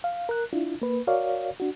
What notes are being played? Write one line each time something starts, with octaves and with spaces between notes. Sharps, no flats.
F5
A#4 F#6
D4 E4 F4
A#3 B4
F#4 A#4 C#5 D5 F5
D4 F#4